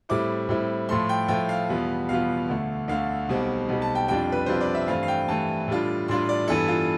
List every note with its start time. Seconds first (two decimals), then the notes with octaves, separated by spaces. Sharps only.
0.09 A2 G3 C4 E4 D6
0.49 A2 G3 C4 E4
0.89 A2 F3 A3 C6
1.09 G5
1.28 A2 F3 A3 G5
1.49 F5
1.69 E2 B2 G3 B3 F4
2.09 E2 B2 G3 B3 F4 F5
2.49 D2 D3 A3
2.88 D2 D3 A3 F5
3.29 B1 B2 G3 C4
3.68 B1 B2 G3 C4
3.82 A5
3.95 G5
4.08 F2 C3 G3 D4 F4 G5
4.32 B4
4.46 F2 C3 G3 D4 F4 C5
4.61 D5
4.75 E5
4.88 G2 E3 A3 C4 F5
5.03 F5
5.08 G5
5.28 G2 E3 A3 C4 A5
5.68 A2 G3 D4 F4
6.08 A2 G3 D4 F4 C6
6.29 D5
6.48 G2 E3 B3 E4 A4
6.68 F4